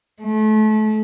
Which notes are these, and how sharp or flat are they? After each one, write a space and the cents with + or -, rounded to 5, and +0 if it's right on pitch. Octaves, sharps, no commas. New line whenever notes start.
A3 -30